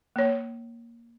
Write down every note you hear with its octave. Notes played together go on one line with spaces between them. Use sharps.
A#3 C#5